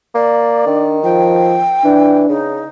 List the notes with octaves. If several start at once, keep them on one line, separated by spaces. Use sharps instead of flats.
A#3 D5
D#3 D4
F3 G5
E3 D4
C#3 D#4